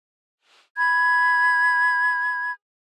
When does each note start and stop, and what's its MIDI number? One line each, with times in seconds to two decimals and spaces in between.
0.78 2.52 83
0.78 2.52 92